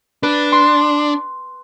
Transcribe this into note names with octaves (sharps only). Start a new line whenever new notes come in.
D4 B4
C6